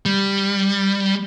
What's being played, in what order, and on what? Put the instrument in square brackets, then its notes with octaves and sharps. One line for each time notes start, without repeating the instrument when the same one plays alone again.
[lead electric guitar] G3